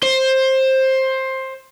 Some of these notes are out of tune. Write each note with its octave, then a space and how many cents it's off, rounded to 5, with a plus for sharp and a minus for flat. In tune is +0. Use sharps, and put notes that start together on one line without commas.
C5 +15